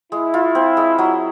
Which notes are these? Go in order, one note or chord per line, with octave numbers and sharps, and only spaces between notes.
G#3 E4
F4
C4
G#3
F#3